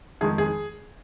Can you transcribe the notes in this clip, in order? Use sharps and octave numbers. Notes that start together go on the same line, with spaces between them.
F2 D#3 G#3 G#4
G#4